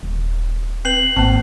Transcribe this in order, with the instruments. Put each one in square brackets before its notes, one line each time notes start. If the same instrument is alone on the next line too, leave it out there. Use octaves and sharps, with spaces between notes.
[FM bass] D#1
[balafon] C4 B4 [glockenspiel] C7 F#7
[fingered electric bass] G#1 [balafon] A#3 A5 [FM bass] C4